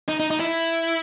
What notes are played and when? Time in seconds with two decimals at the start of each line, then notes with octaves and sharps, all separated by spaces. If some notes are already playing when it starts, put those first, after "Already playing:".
0.09 D#4
0.20 D#4
0.31 D#4
0.40 E4